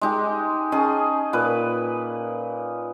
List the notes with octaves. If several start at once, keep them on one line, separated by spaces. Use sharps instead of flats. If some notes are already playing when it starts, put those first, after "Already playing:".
G#3 D#4 G4
C#4 G#4 D#5 A5
A#2 B4